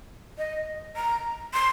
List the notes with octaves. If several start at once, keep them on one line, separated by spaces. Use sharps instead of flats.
D#5
A#5
C6